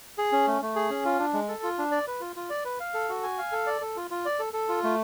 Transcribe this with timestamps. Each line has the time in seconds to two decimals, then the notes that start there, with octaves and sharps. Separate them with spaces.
0.18 G#4
0.32 C#4
0.47 A3
0.62 A3
0.76 G#4
0.90 C#4
1.05 F4
1.19 D4
1.33 G#3
1.48 A4
1.63 F4
1.78 D4
1.92 D5
2.07 B4
2.21 F4
2.36 F4
2.50 D5
2.65 B4
2.80 F5
2.94 A4
3.09 F#4
3.23 G#5
3.38 F5
3.52 A4
3.66 D5
3.81 A4
3.96 F4
4.11 F4
4.25 D5
4.39 A4
4.53 A4
4.69 F4
4.84 A3